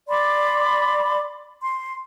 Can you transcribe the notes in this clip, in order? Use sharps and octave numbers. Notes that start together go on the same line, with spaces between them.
D5 B5 C6 D6
C6